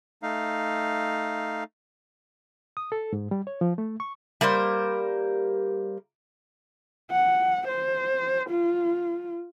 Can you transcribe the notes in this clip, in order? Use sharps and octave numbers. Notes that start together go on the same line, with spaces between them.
A3 D#4 F5
D#6
A4
G#2
G3
C#5
F3
A3
C#6
G3 A#3 A#4 C5
F#5
C5
F4